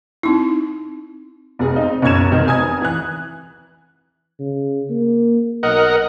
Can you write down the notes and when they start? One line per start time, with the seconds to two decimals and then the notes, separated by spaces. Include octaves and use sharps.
0.23 C4 D#4 E4
1.59 F1 G#4
1.76 C4 D#4
2.02 F#1 B1 C#4 G#6 E7
2.30 F1 D#3 C4
2.47 F1 G#5 D#6 G#6
2.81 E3 F#6
4.40 C#3
4.90 A#3
5.63 B1 A#4 D#5 F#5